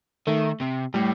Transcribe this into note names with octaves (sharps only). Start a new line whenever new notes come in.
D#3 A3
C3
A2 G3